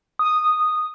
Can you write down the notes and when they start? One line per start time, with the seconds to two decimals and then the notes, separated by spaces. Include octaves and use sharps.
0.19 D#6